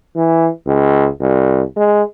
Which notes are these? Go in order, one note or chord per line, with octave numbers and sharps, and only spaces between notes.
E3
C#2
C2
G#3